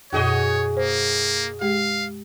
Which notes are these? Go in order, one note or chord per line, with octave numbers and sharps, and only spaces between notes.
F#2 B2 F#4 G#4 C#5 D#5
A#3 C5
G#3 G4 F5